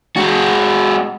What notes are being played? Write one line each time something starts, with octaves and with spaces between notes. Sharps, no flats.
G#3 F#4